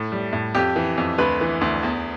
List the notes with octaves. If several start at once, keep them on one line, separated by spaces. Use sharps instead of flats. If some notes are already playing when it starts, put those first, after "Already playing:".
Already playing: A2
G3
A2
F2 G4
E3
F2
D2 B4
E3
D2
E2